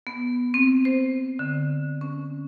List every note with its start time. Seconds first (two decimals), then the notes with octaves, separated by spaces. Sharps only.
0.07 B3
0.54 C4
0.85 C5
1.39 D3
2.01 C#4